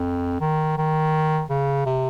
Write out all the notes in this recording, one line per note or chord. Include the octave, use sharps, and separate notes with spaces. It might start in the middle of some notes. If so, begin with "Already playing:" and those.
Already playing: F2
D#3
D#3
C#3
C3